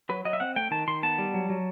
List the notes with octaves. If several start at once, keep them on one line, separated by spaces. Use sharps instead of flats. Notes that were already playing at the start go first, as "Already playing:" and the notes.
F#3 B4
F#3 D#5
E5
C4 F#5
A3 G5
D#3 A5
D#3 C6
B3 A5
G3
F#3
F#3